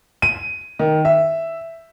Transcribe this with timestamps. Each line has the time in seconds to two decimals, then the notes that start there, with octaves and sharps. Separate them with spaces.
0.22 D#7
0.79 D#3
1.05 E5